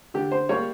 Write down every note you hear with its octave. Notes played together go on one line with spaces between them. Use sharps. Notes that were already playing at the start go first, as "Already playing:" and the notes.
D3 G4
C5
G3 A#3 C#5